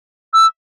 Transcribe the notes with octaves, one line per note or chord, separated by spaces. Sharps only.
E6